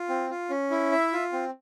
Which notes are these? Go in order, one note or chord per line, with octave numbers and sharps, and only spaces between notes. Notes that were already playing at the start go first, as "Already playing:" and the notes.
Already playing: F4
C4
F4
C#4
E4
E5
F4
C4